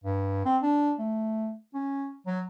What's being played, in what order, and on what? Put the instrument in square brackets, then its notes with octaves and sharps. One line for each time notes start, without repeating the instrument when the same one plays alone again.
[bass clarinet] G2
C4
D4
A3
C#4
F#3